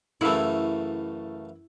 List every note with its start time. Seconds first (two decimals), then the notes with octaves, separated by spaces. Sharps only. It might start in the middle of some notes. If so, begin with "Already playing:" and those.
0.21 F#2 C#3 E3 A3 E4